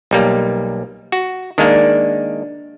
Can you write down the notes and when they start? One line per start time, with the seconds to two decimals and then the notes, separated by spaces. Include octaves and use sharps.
0.11 B1 G3 A#3
1.12 F#4
1.58 D#3 G#3 A#3 D4